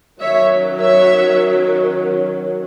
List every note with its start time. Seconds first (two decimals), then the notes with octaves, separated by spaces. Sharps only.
0.21 D#3 F#3 C#4 C#5 E5
0.80 C#5 E5